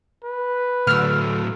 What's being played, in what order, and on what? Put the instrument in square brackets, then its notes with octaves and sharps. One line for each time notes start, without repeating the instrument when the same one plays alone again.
[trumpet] B4
[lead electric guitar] A2 F#3 [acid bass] D3 [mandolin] E6 F6